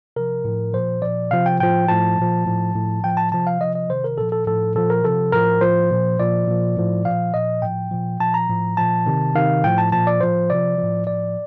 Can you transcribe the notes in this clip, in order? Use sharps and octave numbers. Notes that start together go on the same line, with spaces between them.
C3 F3 A#4
A2 F3
A#2 F3 C5
A#2 F3 D5
C3 F3 F5
G5
A2 F3 G5
A2 F3 A5
A#2 F3
A2 F3
A2 F3
A2 F3 G5
A5
C3 F3 A5
F5
C3 F3 D#5
D#5
C3 D#3 C5
A#4
A#2 F3 A4
A4
A2 F3 A4
A#2 F3 A4
A#4
C3 F3 A4
A2 F3 A#4
A2 F3 C5
A#2 F3
A#2 F3 D5
A#2 F3
A2 F3
A#2 F3 F5
A#2 F3 D#5
A2 F3 G5
A#2 F3
A#2 F3 A5
A#5
A2 F3
A#2 F3 A5
C3 D#3
C3 D#3 F5
A2 F3 G5
A5
A#2 F3 A5
D5
A2 F3 C5
C3 F3 D5
F3
A2
A2 F3 D5